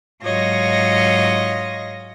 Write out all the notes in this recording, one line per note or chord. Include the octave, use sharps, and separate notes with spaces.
G#2 F#3 F4 C#5 D#5 A#6